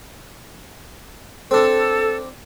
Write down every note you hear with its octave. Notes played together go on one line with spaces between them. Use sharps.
C4 D4 A4